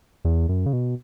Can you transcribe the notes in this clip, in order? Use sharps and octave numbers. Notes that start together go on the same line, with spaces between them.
E2
F#2
C#3
B2